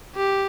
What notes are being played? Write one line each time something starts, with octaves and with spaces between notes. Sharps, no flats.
G4